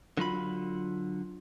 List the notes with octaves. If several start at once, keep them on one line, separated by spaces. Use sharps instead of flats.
D3 F#3 F4 B5